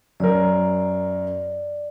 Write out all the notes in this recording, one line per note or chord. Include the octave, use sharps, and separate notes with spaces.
F#2 A#4 D5